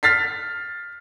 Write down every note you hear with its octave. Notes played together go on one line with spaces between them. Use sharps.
F6 A6 B6 C7